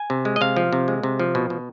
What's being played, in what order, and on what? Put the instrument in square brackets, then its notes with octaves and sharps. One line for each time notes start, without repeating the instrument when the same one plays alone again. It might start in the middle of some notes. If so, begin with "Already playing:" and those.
Already playing: [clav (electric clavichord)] G#5
C3
G#3
D#5
C3 F5
F3
C3
G#3
C3
F3
B2
B2